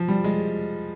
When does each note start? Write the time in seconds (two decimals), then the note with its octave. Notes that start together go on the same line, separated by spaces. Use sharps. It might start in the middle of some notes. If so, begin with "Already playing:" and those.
Already playing: F3
0.08 G3
0.24 G#3